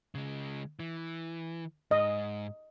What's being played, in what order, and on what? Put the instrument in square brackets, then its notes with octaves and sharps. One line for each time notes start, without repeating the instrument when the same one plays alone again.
[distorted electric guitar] C#3 G#3
E3
[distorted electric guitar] G#2 [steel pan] D#5